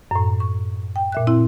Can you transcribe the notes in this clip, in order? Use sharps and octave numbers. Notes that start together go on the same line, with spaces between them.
F#2 A2
C#6
G5
A#2 E5 F#6
C4 E4